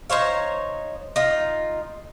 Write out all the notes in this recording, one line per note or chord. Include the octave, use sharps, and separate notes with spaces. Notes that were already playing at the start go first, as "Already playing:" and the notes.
D#4 C5 C#5 F5
D#4 F4